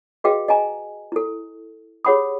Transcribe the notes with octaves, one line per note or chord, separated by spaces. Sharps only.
F#4 G#4 B4 D#5 F5 G5
D#5 F5 G#5 A#5
E4 A4
G4 G#4 C#5 F#5 B5 D#6